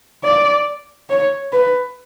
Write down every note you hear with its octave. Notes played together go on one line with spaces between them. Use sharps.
D5
C#5
B4